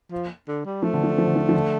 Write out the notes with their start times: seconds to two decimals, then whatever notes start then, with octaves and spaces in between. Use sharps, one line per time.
0.11 F3
0.48 D3
0.65 G3
0.82 F3 A3
0.93 D3
1.03 F3
1.18 F3
1.27 D3
1.36 F3
1.49 F3
1.53 D3